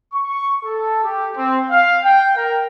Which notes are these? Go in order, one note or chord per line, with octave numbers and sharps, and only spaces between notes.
C#6
A4
G4
C4
F5
G5
A#4